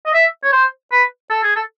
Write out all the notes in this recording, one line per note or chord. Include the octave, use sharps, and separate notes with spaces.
D#5
E5
C#5
C5
B4
A4
G#4
A4